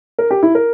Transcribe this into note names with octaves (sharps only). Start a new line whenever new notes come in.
A#4
G4
E4
A#4